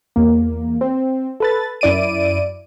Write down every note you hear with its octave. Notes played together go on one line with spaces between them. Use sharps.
E2 A#3
C4
A4 B4 A6
F#2 E4 D5 D7 D#7